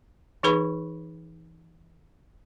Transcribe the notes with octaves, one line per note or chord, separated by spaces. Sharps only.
E3 D#4 G#4 B4 B5 C#6